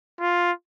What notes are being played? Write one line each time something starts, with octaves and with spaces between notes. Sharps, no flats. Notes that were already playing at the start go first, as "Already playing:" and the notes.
F4